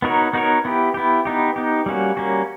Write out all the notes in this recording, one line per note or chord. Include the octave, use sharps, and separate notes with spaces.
B3 D#4 F#4 A#4 C#5
B3 D#4 F#4 A#4 C#5
B3 E4 G4
B3 E4 G4
B3 D#4 G4
B3 D#4 G4
G3 A#3 C#4 F#4
G3 A#3 C#4 F#4